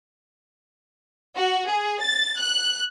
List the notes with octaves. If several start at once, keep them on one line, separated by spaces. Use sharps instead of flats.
F#4
G#4
A6
F#6